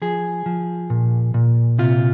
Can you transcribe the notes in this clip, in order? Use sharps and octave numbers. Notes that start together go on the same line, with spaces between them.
F3 G#4
F3
A#2
A#2
C3 F4